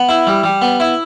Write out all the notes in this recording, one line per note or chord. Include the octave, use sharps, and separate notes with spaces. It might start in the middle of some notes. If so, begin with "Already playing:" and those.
Already playing: B3
E4
G3
G3
B3
E4